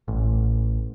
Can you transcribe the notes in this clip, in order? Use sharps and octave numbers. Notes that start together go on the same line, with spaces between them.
A1